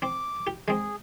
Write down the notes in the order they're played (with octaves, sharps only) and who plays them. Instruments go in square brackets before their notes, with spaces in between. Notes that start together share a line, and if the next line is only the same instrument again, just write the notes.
[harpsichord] C4 [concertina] D6
[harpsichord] G4
[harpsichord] G#3 C4 [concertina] G#4